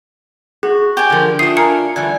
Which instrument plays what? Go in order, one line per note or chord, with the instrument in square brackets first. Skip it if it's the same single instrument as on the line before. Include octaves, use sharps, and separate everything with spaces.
[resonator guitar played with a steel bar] F#4 [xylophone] G#4
[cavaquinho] G4 D5 G#5
[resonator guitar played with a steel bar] D3 F3 [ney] A#4
[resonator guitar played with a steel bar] A3 D4 [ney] F4 [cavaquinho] D#6 [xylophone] C7
[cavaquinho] A#4 F5 G#5 [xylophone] C#7
[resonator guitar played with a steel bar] D3 E3 G3 [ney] D5 [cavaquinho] G#5